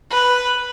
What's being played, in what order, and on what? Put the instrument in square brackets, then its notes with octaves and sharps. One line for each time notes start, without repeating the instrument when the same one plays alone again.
[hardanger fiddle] B4